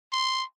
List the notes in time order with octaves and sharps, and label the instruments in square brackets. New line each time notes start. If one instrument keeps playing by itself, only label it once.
[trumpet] C6